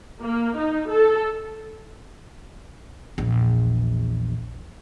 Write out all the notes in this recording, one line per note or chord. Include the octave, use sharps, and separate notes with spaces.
A#3
D#4
A4
A#1 E2